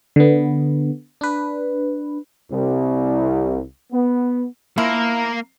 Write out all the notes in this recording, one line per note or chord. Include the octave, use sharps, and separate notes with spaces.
D3 B3
D4 B4
C2
B3
F3 A#3 E4 A#4